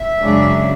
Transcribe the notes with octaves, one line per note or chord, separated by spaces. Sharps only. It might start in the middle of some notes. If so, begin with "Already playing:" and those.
Already playing: E5
F#2 C#3 G#3 D4